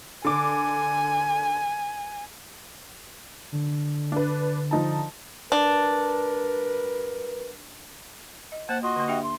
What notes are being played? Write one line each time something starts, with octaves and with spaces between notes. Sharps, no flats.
D3 G#5 D6
D3
D4 B4
F3 D#4 A5
G2 D4 A#4 B4
D#5
A#3 C5 F#5 A5
F4 F#4 D#5 C6
D3 A#3
D4 G4 E5 G5
C6